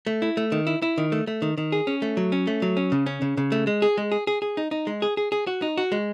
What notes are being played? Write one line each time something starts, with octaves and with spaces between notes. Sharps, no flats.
A3
E4
A3
D#3
E4
E4
D#3
A3
A3
D#3
D#3
G#4
C#4
A3
F#3
C#4
A3
F#3
C#4
C#3
C#4
C#3
C#3
A3
G#3
G#4
G#3
G#4
G#4
G#4
D#4
D#4
G#3
G#4
G#4
G#4
F#4
D#4
F#4
G#3